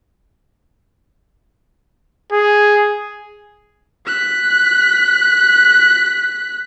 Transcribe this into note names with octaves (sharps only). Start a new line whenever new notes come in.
G#4
F#6 B6